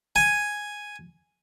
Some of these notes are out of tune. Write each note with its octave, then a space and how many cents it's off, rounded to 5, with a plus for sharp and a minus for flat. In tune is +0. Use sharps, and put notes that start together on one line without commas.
G#5 +0